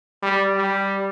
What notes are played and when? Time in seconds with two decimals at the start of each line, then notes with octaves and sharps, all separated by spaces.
0.22 G3
0.57 G3